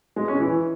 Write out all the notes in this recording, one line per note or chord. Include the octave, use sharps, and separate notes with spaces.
G#3
C#4
E3